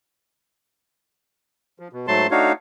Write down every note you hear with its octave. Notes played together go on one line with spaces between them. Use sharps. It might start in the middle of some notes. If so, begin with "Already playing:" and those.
F3
B2
G#2 F#3 A3 A5 C6
A3 D4 D#4 F#4 C#5 F5